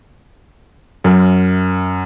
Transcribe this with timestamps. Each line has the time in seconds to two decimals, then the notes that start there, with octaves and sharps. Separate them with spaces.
1.04 F#2